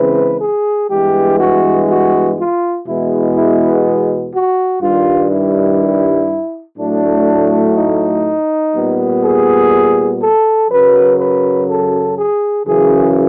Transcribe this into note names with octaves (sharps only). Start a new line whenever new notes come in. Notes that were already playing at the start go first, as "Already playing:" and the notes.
Already playing: C#3 E3 G#3 C4 B4
G#4
G2 E3 G#3 B3 G4
F#4
F#4
F4
E2 B2 G#3 B3 E4
E4
F#4
G2 D#3 G3 F4
E4
A2 F#3 A3 D4
D#4
A#2 G3 B3
G#4
A4
F#2 C#3 F#3 B4
B4
A4
G#4
F#2 C#3 E3 G#4